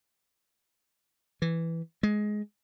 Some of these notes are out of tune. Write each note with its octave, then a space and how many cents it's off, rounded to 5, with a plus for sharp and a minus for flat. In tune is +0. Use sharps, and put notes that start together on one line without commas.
E3 +5
G#3 +15